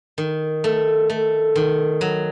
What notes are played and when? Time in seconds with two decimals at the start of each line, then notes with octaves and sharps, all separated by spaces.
0.18 D#3
0.64 A3
1.10 A3
1.56 D#3
2.01 F#3